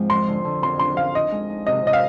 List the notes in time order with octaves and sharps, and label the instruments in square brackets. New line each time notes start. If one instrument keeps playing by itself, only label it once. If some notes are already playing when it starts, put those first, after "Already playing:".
Already playing: [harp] G#2 F3 G#3 C4
[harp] F2 [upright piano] C6
[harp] D3
D3
[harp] F2 [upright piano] C6
[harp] D4 [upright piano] C6
[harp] F2 [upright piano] F5
[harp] D#4 [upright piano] D#5
[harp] G#3
D#4
[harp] C3 [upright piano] D#5
[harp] C3 [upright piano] D#5
[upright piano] F5